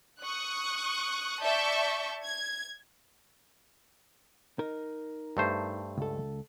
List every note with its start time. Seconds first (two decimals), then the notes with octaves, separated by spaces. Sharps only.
0.22 C#6 D#6 F#6
1.43 D5 E5 A5 C#6 G6
2.23 G#6
4.59 D#4 A#4
5.37 G2 A3 C5
5.97 C#2 A4